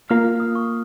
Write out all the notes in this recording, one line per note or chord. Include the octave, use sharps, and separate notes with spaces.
A#3 F4 A#4 F5 F6
F6
D#6
C#6